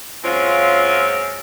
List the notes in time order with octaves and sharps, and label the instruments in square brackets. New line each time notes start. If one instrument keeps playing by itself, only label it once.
[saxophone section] F#2 G#3 C4 C#4 F4 F5